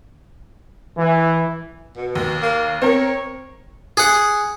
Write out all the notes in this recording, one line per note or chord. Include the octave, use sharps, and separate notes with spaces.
E3
B2
D#2
A#3
C4 A#4 C#5
G#4 F#5